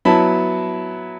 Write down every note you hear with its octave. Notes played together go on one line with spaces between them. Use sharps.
F#3 B3 E4 A5 B5